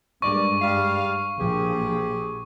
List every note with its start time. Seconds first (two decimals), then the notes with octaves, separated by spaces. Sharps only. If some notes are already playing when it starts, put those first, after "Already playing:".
0.22 G2 A#2 G#3 A#3 D5 C#6
0.62 G3 F5
1.39 A#1 A#2 F3 G4 G#4